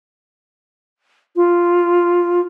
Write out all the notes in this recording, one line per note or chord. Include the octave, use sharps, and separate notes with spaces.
F4